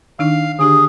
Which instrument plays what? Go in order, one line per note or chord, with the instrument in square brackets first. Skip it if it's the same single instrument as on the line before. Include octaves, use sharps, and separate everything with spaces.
[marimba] D#3 D4 D#4 [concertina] F5
[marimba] D3 D4 G4 [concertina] G#4